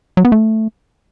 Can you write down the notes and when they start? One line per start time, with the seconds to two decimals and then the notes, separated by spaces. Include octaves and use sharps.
0.17 F#3
0.25 B3
0.32 A3